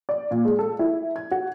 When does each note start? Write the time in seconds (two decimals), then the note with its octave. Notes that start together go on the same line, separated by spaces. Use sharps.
0.09 D5
0.31 A#2
0.45 G#3
0.59 A4
0.79 E4
1.16 G#6
1.31 F#4